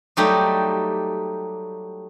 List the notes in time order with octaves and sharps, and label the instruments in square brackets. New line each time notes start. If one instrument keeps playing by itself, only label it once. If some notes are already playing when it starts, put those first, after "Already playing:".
[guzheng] F#3 G3 A3 D#4 G4